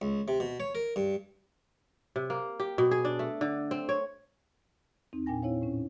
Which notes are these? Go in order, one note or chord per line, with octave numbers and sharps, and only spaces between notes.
C#2
C3
B2
C#5
A#4
G2
C3
A#3
G4
B2
G#4
D4
A3
D3
C4
C#5
E2 C4 D#4
A#2 D4 G5 G#5 A#6
C4 E4 C5 C#5 F5
A2 C#4